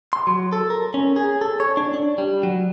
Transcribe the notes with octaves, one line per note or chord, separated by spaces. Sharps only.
C6
F#3
A4
A#4
C#4
G#4
A4
C#5
D4
D4
G3
F#3